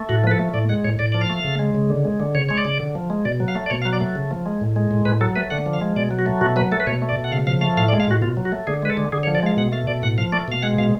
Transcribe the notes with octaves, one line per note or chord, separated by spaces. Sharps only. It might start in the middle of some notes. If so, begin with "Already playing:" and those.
Already playing: A3
A2 F#4
F3 B4
A4
A3
A2 D5
G#3 F#5
A2 C#5
A2 D5
F3 D5
F5
A3
C#3
G#3
C#3
D3
G#3
D3
C#3 C#5
G#3 C#5
D5
C#3
D3
F3
G#3
B2 D5
F#3
F5
A3
D5
B2 C#5
F5
F#3
D5
A3
C#3
F3
G#3
A2
G#3
A2
A2 B4
F#3 A4
A3 B4
D3 F#5
F3
F5
G#3
B2 D5
F#3
F#4
A3
B2 F#4
F#3 B4
A3 A4
B4
B2 C#5
A3
D5
B2
F#5
C#3 F5
F3 F5
A3 F5
A2 F5
D5
G#3
F5
A2 F#4
B2 F4
F#3
F#4
A3
D3 G#4
G#3 B4
A4
D3
D3 G#4
C#5
F3
D5
G#3 F5
B2 F#5
A3 F5
B2 D5
A2 F#5
F3 F5
A3 D5
B2 F5
G#3 F#5
B2 F5